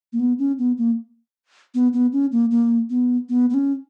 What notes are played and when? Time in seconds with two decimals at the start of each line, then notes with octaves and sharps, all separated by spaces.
0.13 A#3
0.20 B3
0.39 C#4
0.59 B3
0.78 A#3
1.74 B3
1.93 B3
2.13 C#4
2.32 A#3
2.51 A#3
2.90 B3
3.29 B3
3.50 B3
3.54 C#4